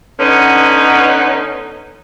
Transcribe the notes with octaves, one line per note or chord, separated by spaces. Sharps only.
D3 B3 C#4 D#4